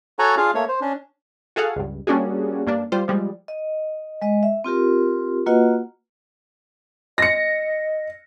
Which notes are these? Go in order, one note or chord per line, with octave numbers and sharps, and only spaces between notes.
F#4 A4 C#5 F#5 G#5 A#5
D4 F4 G#4 F5
A3 A#3 C#5
C5
C#4 D4
F#4 G#4 A4 F5 F#5
C#2 G2
G3 A#3 C#4 D4 F#4 G#4
G2 A#3 D4
G3 F4 C5
F3 G3 G#3
D#5
G#3 D#5
E5
C4 F4 G4 A#4
A#3 F4 F#4 B4 D#5 F#5
D#5 A#6 C#7